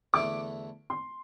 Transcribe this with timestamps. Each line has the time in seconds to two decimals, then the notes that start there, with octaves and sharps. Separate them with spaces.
0.13 E2 D3 A3 E4 D6
0.90 C6